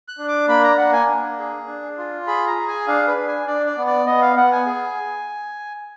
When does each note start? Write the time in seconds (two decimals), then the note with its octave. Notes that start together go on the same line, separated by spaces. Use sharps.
0.08 F#6
0.18 D4
0.28 D6
0.48 A#3 B5
0.63 A#5
0.78 A#3 F#5
0.93 G#5
1.09 D4
1.38 G#4
1.67 D4
1.98 F4
2.27 G#4 B5
2.47 A#5
2.57 G#4
2.68 G#5
2.88 D4 F5
3.07 B4
3.17 D4
3.27 G#5
3.47 D4 D5
3.66 D5
3.77 B3
3.87 D5
4.06 B3 D#5
4.22 F5
4.36 B3 F#5
4.52 G#5
4.66 G#4